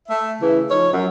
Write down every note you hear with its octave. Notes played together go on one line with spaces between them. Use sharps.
A3 E5
C#3 E3
F3 D#4 C#5
F#2